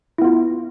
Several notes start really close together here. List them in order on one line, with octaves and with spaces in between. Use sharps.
E4 B3 F4